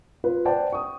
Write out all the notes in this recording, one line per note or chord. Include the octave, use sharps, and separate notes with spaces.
F4 B4
C5 D5 F#5 G5 A5
C#6 D#6